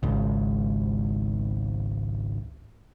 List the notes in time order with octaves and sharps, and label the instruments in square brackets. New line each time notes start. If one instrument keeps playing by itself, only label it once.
[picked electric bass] G#1 C#2